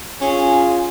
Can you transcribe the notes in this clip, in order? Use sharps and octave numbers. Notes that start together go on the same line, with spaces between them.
C#4 F4 G#4